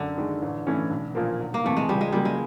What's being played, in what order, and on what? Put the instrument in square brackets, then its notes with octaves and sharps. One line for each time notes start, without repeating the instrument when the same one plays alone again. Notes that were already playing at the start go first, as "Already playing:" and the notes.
Already playing: [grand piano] F#2 [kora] D3
[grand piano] D#3 G#3
A1
G2 E3 A3 C#4
B1
A#2 F3 A#3
E1
[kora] A#3
[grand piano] E2 C3 E3 [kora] A3
[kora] G#3
[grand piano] C#2 [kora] G3
[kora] G#3
[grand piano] C#3 F#3 A#3 [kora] G3
[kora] G#3